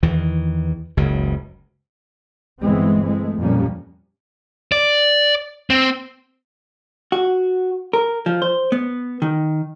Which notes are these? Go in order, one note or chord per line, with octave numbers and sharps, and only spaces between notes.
E2 D#3 E3
F#1 C#2 C#3
G1 G2 E3 G#3 B3 C4
G#3 A3
F2 A#2 F3 G3 A#3 C#4
D5
C4
F#4
A#4
F3
C5
B3
D#3